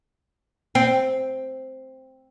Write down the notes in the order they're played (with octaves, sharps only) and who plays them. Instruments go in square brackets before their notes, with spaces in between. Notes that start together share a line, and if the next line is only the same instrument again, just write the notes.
[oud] C4